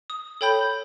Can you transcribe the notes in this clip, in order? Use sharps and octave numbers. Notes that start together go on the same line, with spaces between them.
D#6
A4 C#5 G5 B5 G6